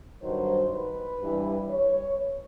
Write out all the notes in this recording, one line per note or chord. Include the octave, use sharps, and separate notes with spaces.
G2 D#3 F#3 C5
B4
G2 E3 G3
C#5